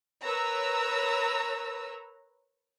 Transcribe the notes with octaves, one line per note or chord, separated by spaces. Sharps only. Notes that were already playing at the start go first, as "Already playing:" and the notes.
A#4 B4 C#5 A#5 E6